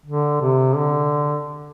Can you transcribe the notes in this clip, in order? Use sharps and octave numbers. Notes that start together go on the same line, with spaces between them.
D3
C3
D3